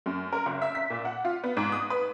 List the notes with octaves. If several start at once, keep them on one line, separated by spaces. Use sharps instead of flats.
F#2
A#4
F#1
E5
B6
A#2
F#5
F4
B3
G#2
D#6
B4